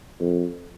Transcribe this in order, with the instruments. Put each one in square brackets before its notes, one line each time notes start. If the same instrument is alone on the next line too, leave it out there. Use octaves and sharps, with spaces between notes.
[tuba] F2